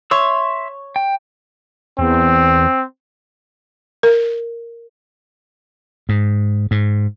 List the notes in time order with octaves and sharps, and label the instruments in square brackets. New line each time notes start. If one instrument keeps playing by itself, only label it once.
[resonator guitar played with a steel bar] C#5 [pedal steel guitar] E5 C6 E6
[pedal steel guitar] G5
[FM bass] E2 [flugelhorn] C4
[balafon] A#4
[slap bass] G#2
G#2